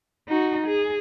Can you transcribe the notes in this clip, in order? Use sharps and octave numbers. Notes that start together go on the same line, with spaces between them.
D#4 F#4
G#4